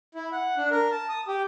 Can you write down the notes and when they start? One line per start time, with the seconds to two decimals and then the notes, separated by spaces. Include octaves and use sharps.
0.15 E4
0.32 F#5
0.57 D4
0.71 A#4
0.91 A5
1.09 D#6
1.28 G4